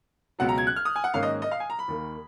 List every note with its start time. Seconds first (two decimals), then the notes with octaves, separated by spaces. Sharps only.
0.39 C#2 B2 F#3 F#5
0.49 A#5
0.58 G#6
0.67 F#6
0.76 F6
0.85 D#6
0.96 G#5
1.04 F#5
1.14 G#2 D#3 A#3 C#4 F5
1.23 D#5
1.42 D#5
1.51 F5
1.60 G#5
1.70 A#5
1.79 B5
1.88 D#2 D#3 A#3